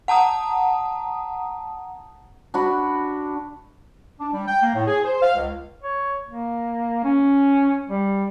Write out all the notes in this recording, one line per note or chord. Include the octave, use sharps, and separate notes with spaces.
F#5 A5 A#5 D#6
D4 F#4 B5
D4
G3
G5
A#3
A2
G#4
C5
F5
C#2
C#5
A#3
C#4
G3